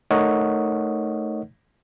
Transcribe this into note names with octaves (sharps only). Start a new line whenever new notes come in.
A3 D#4 A#4 C#5 D#5 F#5